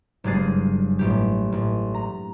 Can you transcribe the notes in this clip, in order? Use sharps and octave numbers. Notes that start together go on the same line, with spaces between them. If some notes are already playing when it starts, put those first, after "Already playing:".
F#1 G2 G#3 G#4 A6 C7
A1 G4
A1
A#5